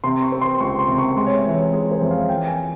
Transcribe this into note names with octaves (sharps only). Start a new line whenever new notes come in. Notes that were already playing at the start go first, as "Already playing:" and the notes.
C3 C6
C#6
C4
C6
C#2 C#6
C6
C3
C#6
G#3 C6
C#5
E5
E3
C#5
G#3 G#4
C5
F2
F5
E3 G5
G#5